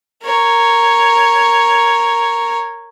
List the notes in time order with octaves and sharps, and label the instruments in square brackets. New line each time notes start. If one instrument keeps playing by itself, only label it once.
[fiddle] A#4 C#5